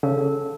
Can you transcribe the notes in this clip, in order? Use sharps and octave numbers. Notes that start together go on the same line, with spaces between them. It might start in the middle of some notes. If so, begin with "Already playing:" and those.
C#3 A4